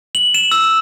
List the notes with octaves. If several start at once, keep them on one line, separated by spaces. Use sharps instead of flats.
F#7
E7
E6